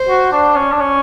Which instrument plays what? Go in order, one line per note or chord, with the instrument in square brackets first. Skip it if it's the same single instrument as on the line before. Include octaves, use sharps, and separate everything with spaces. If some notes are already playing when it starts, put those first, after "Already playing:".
Already playing: [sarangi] C5
[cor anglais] F#4
D4
C#4
D4
C#4